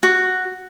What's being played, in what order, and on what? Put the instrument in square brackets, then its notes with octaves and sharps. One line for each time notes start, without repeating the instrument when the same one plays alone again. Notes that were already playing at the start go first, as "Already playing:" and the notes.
[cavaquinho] F#4